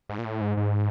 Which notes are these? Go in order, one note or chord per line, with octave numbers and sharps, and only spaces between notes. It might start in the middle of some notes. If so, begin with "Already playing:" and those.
G#2
A#2
A2
G#2
G#2